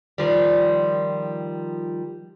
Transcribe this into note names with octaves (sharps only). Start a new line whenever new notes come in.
D#3 F3 G3